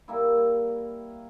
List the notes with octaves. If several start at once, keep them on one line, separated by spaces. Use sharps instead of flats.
G3 A#3 E4